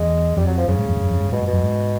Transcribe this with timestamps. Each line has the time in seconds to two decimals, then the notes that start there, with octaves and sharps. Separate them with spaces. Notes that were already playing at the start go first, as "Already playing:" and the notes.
Already playing: E2 G#3
0.37 F2 G3
0.47 F#3
0.58 F3
0.68 F#2 C#3
0.79 G#2
0.89 F2
0.96 G2
1.00 F#2
1.10 F2
1.21 G2
1.32 G#2 B2
1.43 G2 B2
1.53 F#2
1.63 G#2